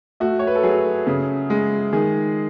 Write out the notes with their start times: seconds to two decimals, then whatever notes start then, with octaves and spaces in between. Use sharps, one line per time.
0.20 A3 F#4
0.39 C#5
0.47 B4
0.55 A4
0.63 F#3 G#4
1.07 C#3
1.50 G#3
1.93 D#3 G#4